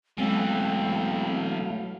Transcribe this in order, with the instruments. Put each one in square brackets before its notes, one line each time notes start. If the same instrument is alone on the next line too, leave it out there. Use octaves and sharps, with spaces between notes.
[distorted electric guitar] B2 E3 [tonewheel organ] F#3 A3 F5 [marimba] G#3 [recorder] C4